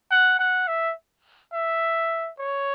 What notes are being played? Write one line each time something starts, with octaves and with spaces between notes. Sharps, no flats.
F#5
F#5
E5
E5
C#5